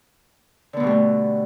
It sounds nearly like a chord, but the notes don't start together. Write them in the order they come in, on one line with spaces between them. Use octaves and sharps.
D3 B3 B2 G3 A3